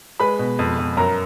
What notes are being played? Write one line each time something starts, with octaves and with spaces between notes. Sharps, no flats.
G#3 B4 B5
B2
F2
F2
F#2 A#4 A#5